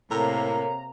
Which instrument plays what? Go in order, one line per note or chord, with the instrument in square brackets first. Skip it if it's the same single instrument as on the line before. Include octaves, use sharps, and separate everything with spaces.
[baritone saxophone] A2 [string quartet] C3 A#3 [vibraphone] A4 A#4 C#5 [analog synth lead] A#5